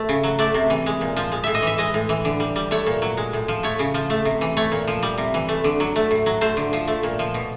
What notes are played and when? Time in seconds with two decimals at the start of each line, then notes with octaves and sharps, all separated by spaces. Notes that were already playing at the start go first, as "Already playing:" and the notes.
Already playing: A3
0.09 C#3
0.24 F#3
0.39 A3 D5
0.54 C3
0.70 E3
0.86 G#3
1.01 A#2
1.17 F3
1.32 G#3
1.44 A2 E5
1.55 D#5
1.62 E3 E5
1.78 G#3 D#5
1.94 A2
2.09 E3
2.25 D3
2.40 G3
2.56 G3
2.71 A3 C#5
2.86 A#2
3.02 F#3
3.17 G#3
3.33 A2
3.48 F3
3.63 A3 C#5
3.79 C#3
3.94 F3
4.10 A3
4.25 C3
4.41 E3
4.57 A3 C#5
4.72 A#2
4.88 F3
5.03 G3
5.18 C3
5.34 E3
5.49 A3
5.64 D3
5.80 F#3
5.96 A3
6.11 A2
6.26 F#3
6.41 A3 C5
6.57 D3
6.73 F3
6.88 A3
7.03 A#2
7.19 F3
7.34 B2